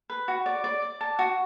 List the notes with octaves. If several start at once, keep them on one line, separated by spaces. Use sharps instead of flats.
B4
F#4
D5
D5
D5
A5
F#4